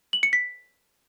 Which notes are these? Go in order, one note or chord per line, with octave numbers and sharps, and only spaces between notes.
F#7
C#7
B6